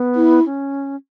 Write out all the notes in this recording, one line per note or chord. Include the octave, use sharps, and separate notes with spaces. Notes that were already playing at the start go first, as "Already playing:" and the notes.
Already playing: B3
E4
C#4